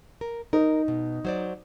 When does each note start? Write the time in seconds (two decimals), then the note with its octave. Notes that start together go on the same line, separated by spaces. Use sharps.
0.21 A#4
0.53 D#4 A#4
0.88 B2
1.25 F#3 C5 D5